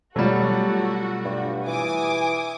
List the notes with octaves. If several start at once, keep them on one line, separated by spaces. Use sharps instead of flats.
B2 F#3 G3 A3 F4 F#4 A4
G2
E3 G#5 D6 D#6